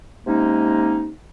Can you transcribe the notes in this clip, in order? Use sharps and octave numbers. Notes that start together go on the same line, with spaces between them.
C3 G#3 A#3 C#4 D#4